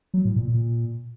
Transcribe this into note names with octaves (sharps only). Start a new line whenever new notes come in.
F#3
A2
A#2
A#2